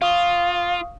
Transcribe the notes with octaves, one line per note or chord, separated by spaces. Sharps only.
F4 F5 C#6 D#6